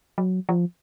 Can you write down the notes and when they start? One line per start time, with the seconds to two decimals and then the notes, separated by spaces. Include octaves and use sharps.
0.18 F#3
0.49 F3